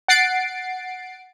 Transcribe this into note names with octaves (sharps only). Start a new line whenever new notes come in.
F#5 A6 C7 D7